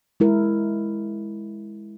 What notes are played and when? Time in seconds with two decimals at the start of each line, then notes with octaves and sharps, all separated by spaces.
0.20 G#3 E4 A#4